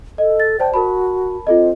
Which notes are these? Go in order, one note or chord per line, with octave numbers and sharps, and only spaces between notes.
A4 D#5
A6
C5 D5 G5 A5
F#4 A#4 A5 B5
C4 F4 A4 D#5